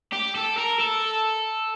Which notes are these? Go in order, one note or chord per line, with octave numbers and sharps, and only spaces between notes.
G4
A4
A#4
A4